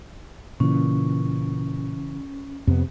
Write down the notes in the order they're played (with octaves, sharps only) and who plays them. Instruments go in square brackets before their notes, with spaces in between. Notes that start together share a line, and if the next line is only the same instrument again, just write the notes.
[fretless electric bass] A#2 [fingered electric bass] C#3 E3 [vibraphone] C#4
[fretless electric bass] F2 B3 [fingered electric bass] C3